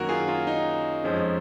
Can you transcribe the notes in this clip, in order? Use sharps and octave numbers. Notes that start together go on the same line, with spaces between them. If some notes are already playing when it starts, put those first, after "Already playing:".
Already playing: F#2 D#3 F#3 A#3 C#4 F#4 A#4
F4 G#4
F4
D#4
F2 F3 G#3 C#4